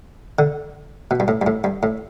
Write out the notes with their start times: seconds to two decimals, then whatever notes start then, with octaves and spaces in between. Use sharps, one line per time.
0.39 D3
1.11 B2
1.20 G2
1.28 A2
1.42 G2
1.47 A2
1.64 G2
1.83 A2